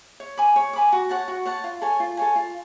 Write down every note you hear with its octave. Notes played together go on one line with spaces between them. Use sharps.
C#5
G#5 B5 D6
C#5
G#5 B5 D6
F#4
C#5 F#5 A5
F#4
C#5 F#5 A5
F4
A4 C#5 G#5
F4
A4 C#5 G#5
F4